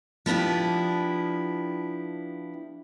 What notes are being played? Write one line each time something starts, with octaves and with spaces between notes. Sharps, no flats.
F3 B3 D4 E4 G4